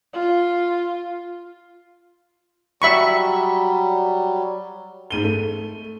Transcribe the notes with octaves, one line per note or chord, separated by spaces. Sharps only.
F4
F#3 G3 E5 B5 C#6
G#2 D#7 G7
A3